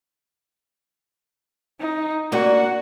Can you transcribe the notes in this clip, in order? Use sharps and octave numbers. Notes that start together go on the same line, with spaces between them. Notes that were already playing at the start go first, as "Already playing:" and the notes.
D#4
A#3 C#4 D4 F#4